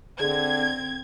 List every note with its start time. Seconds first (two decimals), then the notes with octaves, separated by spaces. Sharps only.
0.20 D3 C4 G#4 G#6